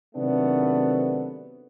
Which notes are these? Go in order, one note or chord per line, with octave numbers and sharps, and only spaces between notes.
C3 D#3 F#3 A3 B3 D4